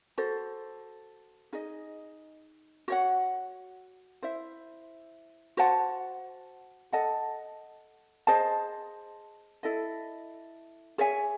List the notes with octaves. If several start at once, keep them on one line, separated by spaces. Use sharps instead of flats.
F#4 A4 C5
D#4 G#4 D#5
F#4 C#5 F#5
E4 C5 E5
F#4 C5 F#5 A5
A4 D#5 F#5 A5
G#4 C5 D#5 A5
E4 A4 D#5
G#4 C#5 E5 G#5